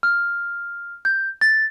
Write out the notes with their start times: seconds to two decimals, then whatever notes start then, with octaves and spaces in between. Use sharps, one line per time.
0.03 F6
1.05 G6
1.41 A6